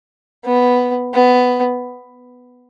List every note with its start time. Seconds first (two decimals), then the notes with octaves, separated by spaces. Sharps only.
0.45 B3
1.14 B3